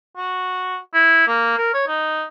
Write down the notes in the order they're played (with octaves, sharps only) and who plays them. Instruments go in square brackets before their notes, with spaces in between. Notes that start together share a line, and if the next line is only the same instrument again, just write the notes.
[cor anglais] F#4
E4
A#3
A#4
C#5
D#4